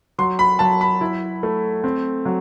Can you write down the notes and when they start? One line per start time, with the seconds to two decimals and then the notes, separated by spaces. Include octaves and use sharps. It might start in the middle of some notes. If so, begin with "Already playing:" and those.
0.19 F#3 C6
0.39 B5
0.59 F#3 A5
0.81 B5
1.01 E4
1.43 A3
1.84 C4
2.25 F#3